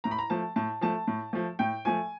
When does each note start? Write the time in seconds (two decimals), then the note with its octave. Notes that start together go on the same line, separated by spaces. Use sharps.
0.04 A2 A#5
0.11 B5
0.19 A#5
0.30 F3 A3 A5
0.56 A2 A5
0.81 F3 A3 A5
1.08 A2
1.33 F3 A3
1.59 A2 G5
1.85 F3 A3 G#5